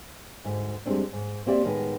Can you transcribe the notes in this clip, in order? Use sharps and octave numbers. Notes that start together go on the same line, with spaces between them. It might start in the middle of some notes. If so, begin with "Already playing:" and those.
D2 G#2
F2 G3 G#3 A#3 C4 D4
G#2
A#3 C4 G4 D5 E5
A2 D#3 G#3 B3